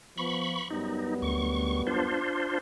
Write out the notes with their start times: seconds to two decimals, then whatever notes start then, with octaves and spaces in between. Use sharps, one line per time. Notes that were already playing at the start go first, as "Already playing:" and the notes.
0.18 F3 B3 B5 C#6
0.70 F#2 G3 B3 D#4
1.22 D2 C#6
1.87 D4 F4 C5